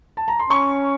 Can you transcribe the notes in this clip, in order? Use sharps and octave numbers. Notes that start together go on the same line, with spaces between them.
A5
A#5
C6
C#4 C#6